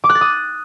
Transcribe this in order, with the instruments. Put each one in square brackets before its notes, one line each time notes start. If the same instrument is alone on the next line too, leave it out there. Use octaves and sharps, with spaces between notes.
[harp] D6
F#6
A6
D#6